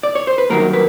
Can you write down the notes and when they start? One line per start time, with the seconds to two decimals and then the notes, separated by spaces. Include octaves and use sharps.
0.03 D5
0.15 C#5
0.27 C5
0.38 B4
0.50 G2 D#3 F#3 A#3 A#4
0.73 B4